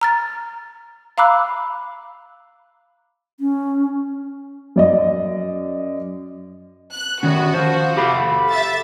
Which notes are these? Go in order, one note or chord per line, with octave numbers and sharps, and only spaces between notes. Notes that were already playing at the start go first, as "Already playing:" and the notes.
A#5 F6 A6
F5 A#5 B5 D6 E6 F#6
C#4
F#2 D5 D#5
F#6
F#2 D#3 B3 C#4 F#4
F3 C5
G4 A4 F5 B5
E5 A6